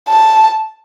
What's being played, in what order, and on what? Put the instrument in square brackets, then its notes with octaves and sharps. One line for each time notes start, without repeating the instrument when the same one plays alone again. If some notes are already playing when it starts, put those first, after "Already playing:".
[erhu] A5